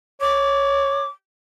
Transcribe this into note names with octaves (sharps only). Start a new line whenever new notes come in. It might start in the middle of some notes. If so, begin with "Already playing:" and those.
C#5 D6